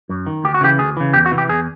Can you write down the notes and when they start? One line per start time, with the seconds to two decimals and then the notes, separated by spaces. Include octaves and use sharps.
0.09 F#2
0.27 D#3
0.44 D2 G4
0.54 F#4
0.61 C#3 E3 G4
0.79 D2 G#4
0.97 C#3 E3
1.13 E2 G4
1.26 F#4
1.31 C3 E3
1.38 G4
1.49 E2 G#4